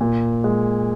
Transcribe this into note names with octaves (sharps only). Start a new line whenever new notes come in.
A#2
G#3